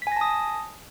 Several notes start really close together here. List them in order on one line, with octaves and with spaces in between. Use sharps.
B6 G#5 A#6 A5 D#6